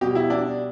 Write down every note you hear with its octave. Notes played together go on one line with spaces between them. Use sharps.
B2 G3 G4
E4
D4